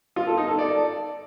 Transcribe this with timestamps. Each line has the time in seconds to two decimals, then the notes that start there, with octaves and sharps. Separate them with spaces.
0.16 F4
0.27 A4
0.37 D#4
0.48 A4
0.59 D5